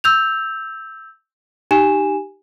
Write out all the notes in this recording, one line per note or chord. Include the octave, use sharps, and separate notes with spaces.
E6 G6 F7
D#4 G4 G#5 E7